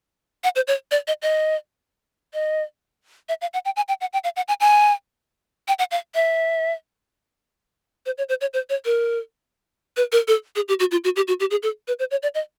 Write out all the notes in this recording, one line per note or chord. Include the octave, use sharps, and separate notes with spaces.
F#5
C5
C#5
D5
D#5
D#5
D#5
E5
F5
F#5
G5
G#5
G5
F#5
G5
F5
F#5
G#5
G#5
G5
F#5
F5
E5
C5
C#5
C5
C#5
C5
C#5
A#4
B4
A#4
A4
G#4
G4
F#4
F4
F#4
G4
F#4
G4
G#4
A4
B4
C5
C#5
D5
D#5